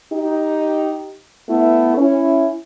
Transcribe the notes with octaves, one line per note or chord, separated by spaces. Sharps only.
D#4 G4
A3 B3 E4
C#4 E4